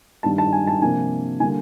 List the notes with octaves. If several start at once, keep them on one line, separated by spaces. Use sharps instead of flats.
G2 D#3 G3 A5
A5
G#5
A5
C3 F3 A#3 D4 G#5
D3 G3 A#3 D4 G#5